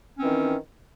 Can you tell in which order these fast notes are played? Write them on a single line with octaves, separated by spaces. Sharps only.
C#4 C4 E3 D#3